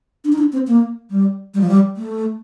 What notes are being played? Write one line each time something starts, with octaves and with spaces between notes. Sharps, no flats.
D4
D#4
D4
C4
A#3
G3
G3
F3
G3
A3